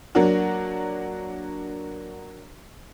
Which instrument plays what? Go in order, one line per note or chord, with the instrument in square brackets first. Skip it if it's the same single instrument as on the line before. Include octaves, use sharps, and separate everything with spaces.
[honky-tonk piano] F#3 A#3 D4 F#4